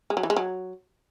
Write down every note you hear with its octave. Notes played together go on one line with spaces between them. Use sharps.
G#3
F#3
E3
G#3
F#3